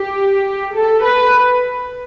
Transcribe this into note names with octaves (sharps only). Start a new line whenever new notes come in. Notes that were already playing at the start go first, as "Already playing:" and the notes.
Already playing: G4
A4
B4